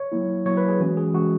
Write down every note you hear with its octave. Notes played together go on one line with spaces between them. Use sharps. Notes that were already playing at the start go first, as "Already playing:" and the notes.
Already playing: C#5
F#3 A#3 E4
F#3 A#3 E4 C#5
B4
G#4
E3 G#3 C#4 F#4
G#4
E3 G#3 C#4 F#4